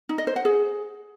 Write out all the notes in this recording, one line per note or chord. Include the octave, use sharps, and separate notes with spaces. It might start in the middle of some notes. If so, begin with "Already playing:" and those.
D#4
D#5
C5
F#5
G#4